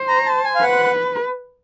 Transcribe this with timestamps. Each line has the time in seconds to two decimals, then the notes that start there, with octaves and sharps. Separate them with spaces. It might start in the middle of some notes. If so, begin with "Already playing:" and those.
Already playing: C5
0.08 A#5
0.26 A5
0.45 G#5
0.55 F5
0.62 B4 F#5